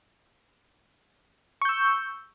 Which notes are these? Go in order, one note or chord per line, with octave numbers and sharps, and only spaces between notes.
C#6 E6 G6